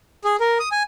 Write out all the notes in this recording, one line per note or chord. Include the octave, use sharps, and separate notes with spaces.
G#4
A#4
D#6
G#5